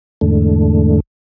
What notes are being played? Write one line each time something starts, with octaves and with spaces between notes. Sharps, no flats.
E2 G#2 D3 A3